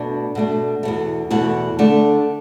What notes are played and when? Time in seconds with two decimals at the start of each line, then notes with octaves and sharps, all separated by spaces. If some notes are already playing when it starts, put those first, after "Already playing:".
Already playing: B2 A3 D4
0.35 B2 A3 D4
0.83 E2 B2 A3
1.30 E2 B2 A3 F#5
1.79 D3 A3 D4